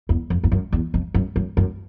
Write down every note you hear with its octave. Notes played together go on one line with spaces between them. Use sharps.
E2
F2
F2
F#2
E2
F2
F#2
F#2
F#2